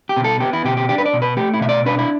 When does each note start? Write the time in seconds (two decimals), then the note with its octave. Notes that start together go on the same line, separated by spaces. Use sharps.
0.09 G4
0.16 B2
0.24 A4
0.40 B3 G4
0.53 E4
0.65 B2 G4
0.77 G4
0.89 D4 G4
0.98 B4
1.06 D5
1.13 B2
1.22 B4
1.37 A3 G4
1.54 E4
1.61 B2 E5
1.69 D5
1.86 D4 B4
1.99 E4